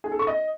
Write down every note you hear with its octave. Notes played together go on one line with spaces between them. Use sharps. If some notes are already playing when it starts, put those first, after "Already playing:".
G#4
A4
C#6
D#5